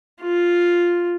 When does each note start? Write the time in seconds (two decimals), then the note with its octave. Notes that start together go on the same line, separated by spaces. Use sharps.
0.21 F4